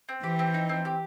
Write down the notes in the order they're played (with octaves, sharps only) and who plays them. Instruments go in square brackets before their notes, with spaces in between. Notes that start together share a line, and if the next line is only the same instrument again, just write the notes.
[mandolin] C4
[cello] E3 [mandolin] G4
[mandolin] C4
D#4
C4
G4